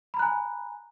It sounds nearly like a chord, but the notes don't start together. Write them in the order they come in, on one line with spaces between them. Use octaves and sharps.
B5 A#5 F#6 G#5